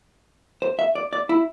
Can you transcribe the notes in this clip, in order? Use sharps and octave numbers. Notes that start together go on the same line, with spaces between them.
C5
E5
D5
D5
E4